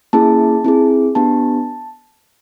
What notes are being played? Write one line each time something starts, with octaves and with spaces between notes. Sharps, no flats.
A#3 C#4 E4 G#4 A5
C4 E4 G#4
B3 D4 G4 A5